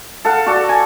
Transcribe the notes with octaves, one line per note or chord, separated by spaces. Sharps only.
A4 F5 F#5
F#4 A4 D5
G#5